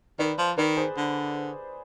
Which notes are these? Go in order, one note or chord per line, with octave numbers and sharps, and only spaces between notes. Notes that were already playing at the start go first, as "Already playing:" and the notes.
D#3 B4 D5
F3
D#3 B4 D5
G#4 C5
D3